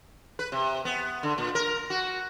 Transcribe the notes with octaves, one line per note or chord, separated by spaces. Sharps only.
B4
C3
B3
D3
A#2
A#4
F#4